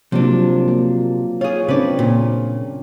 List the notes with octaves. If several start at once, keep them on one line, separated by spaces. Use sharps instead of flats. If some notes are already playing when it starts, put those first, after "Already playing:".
C3 F3 F#3 A#3 D4
A#3
F4 G#4 C#5
C#3 C4 D4 B4 D5
A#2